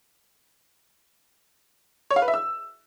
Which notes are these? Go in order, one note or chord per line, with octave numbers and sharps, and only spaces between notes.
C#5
F5
B4
E5
E6